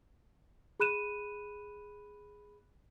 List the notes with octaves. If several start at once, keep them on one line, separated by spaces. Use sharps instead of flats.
G#4 B5 F#6 D#7 E7